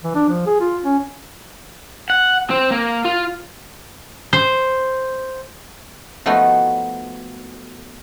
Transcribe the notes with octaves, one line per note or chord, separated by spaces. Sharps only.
E3
D4
F3
G#4
F4
C#4
F#5
C4
A#3
F4
C5
F3 A3 B3 D#4 F#4